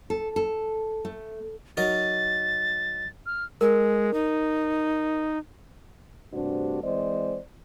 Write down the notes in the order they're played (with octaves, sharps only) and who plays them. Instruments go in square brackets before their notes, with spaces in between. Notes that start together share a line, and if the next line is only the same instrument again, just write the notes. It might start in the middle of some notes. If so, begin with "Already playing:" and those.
[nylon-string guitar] A4
A4
A3
[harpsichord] F#3 D#4 A#4 [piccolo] A6
[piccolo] F6
[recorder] G#3 [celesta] A#4
[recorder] D#4
[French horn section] G2 C3 A3 D4 F#4 C5
E3 G#3 C4 C5 D5 D#5